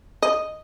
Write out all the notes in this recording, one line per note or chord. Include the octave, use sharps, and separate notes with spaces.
D#5